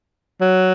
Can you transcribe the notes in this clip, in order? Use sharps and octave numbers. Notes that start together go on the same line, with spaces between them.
F#3